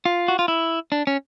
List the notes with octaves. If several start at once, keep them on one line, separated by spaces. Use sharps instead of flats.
F4
F#4
F4
E4
D4
C#4